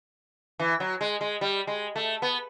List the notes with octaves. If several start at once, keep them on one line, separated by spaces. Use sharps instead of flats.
E3
F#3
G#3
G#3
G3
G#3
A3
B3